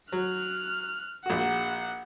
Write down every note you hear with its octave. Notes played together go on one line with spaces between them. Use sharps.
F#3 F6 F#6
A#1 F#4 F#5